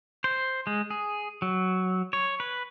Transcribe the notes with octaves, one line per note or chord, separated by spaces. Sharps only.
C5
G#3
G#4
F#3
C#5
B4